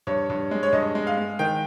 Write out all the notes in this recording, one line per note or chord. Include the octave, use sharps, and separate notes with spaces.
G2 C#5
G2
G#3
C#5
G2 D#5
G#3
F5
G#3
D#3 G5